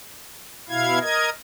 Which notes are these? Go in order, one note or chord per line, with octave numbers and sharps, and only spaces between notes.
B2 E4 F5 G#6
A#4 D#5 G#6